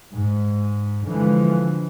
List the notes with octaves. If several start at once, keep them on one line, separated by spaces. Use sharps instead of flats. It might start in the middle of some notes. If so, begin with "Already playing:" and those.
G#2
D3 E3 F3 G#3